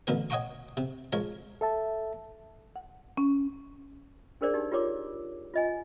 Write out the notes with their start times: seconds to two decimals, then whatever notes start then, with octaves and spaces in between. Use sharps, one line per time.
0.07 A1 B2 D3 A#4 B4
0.30 C#5 D#5 F#5 G5 A#5 C#6
0.77 C3
1.13 F3 G#3 A#4 C#5
1.61 A4 E5 A5
2.76 F#5
3.17 C#4
4.41 D4 G#4 A#4 C5 D5
4.54 D#4 G4
4.72 F4 G4 A#4 C#5 D6
5.54 F4 D#5 G#5